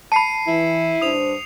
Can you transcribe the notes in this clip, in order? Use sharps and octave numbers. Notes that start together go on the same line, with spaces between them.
A5 B5 C7 C#7 D#7
E3 E4
G2 D4 C5 D#6 F7